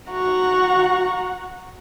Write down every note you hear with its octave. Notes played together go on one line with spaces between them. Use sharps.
F#4 F#5 A#5 C#6